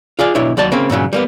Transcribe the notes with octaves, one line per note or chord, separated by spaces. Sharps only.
F4 G#4 D5 F5
B1 B2 D4 E4 C#5
D#2 F#3 D5 A5
C#3 A#3 C4
G2 A#2 C#3 F#3
G3 A#3 B3